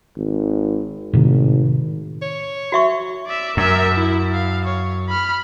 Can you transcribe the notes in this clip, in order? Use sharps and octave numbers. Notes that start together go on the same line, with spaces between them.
G#1
G#1 A2 C3 D#3
C#5
F#4 E5 C#6
D5 E5
F#2 A#4 E5
E4
F5
C#5
B5 F6